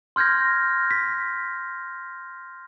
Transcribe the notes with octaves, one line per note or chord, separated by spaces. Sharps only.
C6 F6 G6 G#6 A#6
B6